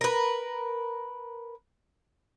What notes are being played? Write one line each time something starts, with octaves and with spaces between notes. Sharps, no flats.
A#4 B4